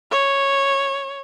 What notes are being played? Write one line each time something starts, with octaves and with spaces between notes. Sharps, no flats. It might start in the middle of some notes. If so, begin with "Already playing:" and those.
C#5